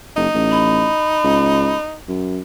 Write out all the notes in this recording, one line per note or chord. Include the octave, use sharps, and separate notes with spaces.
F#1 D#4
A1
B5
C#2
F#2